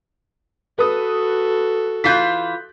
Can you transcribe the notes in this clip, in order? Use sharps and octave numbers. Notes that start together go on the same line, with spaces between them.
F#4 A4 B4 D#6
E3 F4 F#6 G6 B6